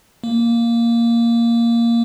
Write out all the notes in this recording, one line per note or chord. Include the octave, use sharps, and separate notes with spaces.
A#3